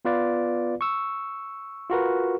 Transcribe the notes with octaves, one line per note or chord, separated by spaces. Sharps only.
B3 F4 B4 D5 F5
C#6 E6
F4 F#4 A#4 B4